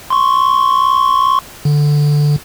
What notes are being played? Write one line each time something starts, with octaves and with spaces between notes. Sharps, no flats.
C6 C#6
D3